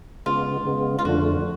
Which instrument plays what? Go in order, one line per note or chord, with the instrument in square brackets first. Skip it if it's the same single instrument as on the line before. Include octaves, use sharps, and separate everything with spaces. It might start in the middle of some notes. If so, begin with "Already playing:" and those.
[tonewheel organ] C#3 G#3 B3 [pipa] F4
[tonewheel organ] C#3 G#3 B3
[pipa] F4
[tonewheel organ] F2 D3 F3 A3 D4 [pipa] F#4